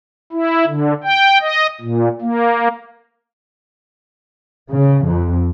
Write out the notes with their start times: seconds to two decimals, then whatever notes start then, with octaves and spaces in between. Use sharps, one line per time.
0.32 E4
0.67 D3
1.04 G5
1.41 D#5
1.81 A#2
2.22 A#3
4.70 C#3
5.06 F2